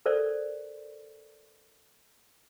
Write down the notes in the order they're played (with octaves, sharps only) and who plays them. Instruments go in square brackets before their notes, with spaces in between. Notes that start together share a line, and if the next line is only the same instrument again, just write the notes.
[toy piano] A4 A#4 C5 D5